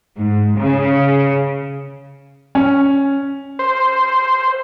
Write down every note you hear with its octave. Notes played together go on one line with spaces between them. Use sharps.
G#2
C#3
C#4
C5